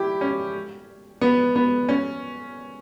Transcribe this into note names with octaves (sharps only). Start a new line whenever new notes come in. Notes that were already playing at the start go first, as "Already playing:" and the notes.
Already playing: E4 G4
C#4
B3
B3
C#4